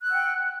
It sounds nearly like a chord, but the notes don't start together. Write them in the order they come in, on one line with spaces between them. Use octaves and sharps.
F#6 E6 F#5 G5